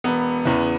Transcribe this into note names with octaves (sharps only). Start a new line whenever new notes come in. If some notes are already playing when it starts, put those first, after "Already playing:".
E1 B3
E2 C#3 E3